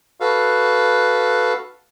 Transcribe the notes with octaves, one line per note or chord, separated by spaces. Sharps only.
F#4 A4 B4 F5